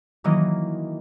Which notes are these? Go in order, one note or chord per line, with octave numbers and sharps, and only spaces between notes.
D#3 E3 F#3 A#3 D#5